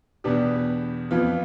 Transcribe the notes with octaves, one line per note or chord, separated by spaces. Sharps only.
E2 B2 B3 D4 G4
F2 E3 B3 F4